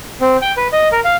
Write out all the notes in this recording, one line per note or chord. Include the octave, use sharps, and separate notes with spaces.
C4
G5
B4
D#5
A#4
F5